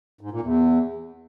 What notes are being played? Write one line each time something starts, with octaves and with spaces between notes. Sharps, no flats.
G#2
A#2
E2